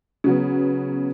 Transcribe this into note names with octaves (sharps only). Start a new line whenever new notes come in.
C#3 F#3 B3